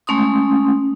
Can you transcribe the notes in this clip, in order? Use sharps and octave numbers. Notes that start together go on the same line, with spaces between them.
G#3 A3 C#4 C6 D#6